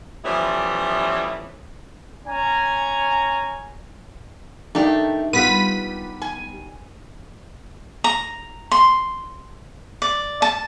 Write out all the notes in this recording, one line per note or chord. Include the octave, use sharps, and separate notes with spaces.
E3 F3 G3 A3 B3 C#4
C#4 G#5 A#5
D#3 A3 D4 D#4 G4
G3 B3 F4 B4 B6 D#7
G#5
A#5
C6
D5
A5